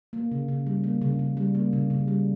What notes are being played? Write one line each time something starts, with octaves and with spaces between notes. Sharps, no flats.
A#3
C#3
C#3
G3
A#3
C#3
C#3
G3
A#3
C#3
C#3
G3